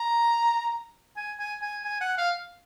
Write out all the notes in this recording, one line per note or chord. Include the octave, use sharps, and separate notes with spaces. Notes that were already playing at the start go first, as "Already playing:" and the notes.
Already playing: A#5
G#5
G#5
G#5
G#5
F#5
F5